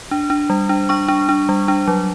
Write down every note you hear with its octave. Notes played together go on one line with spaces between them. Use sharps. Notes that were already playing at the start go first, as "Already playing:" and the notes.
D4
D4
G3
D4
D4 C#6
D4
D4
G3
D4
F#3